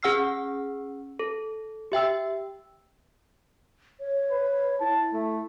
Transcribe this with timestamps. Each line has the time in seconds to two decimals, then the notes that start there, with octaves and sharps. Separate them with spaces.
0.03 C#4 G#4 F#5 E6 F6 C7
1.19 A4
1.92 G4 E5 G5 E6
4.00 C#5
4.31 B4
4.81 E4 A5
5.13 A3